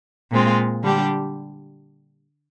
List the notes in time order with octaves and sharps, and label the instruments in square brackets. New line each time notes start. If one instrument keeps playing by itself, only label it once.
[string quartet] A#2 G#3 C4 F4
D3 G3 D4 G4